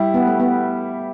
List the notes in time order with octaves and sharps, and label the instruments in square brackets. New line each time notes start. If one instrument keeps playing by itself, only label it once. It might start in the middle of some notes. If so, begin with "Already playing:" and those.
Already playing: [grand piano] G3 E4 G4
[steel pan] B3
A3
B3